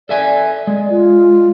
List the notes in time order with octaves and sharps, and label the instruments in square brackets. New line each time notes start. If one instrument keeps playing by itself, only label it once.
[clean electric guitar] A4 E5 G#5 [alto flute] D5
[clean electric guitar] G#3
[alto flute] F4